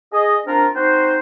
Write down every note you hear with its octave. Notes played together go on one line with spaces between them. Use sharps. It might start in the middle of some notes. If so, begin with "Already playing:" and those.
G#4 D#5
C4 D4 F4 A#4
C4 D#4 F#4 C5